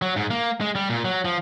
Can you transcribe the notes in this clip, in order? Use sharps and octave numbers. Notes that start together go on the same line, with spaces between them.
F#3
G#2
A#3
G#3
G3
A#2
F#3
F3